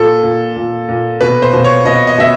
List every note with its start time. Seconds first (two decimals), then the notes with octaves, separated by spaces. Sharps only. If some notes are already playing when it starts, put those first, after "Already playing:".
Already playing: A#2 A4
0.23 A#2
0.56 A#2
0.89 A#2
1.21 B2 B4
1.42 C5
1.53 B2
1.64 C#5
1.85 B2 D#5
2.07 D#5
2.18 B2 E5